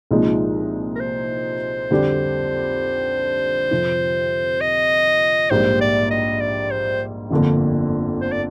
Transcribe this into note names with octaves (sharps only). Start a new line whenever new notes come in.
C2 A#2 F3 G#3 D#4
A#4
C5
F2 D3 G3 D4 G4
F2 C3 F3
D#5
A#1 G#2 G3 A#3 C5
D5
D#5
D5
C5
G1 F2 D3 F3 A#3
C5
D5